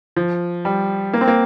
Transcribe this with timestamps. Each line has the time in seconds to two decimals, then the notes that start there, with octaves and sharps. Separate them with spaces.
0.16 F3
0.65 G3
1.13 A#3
1.21 C4
1.28 A#3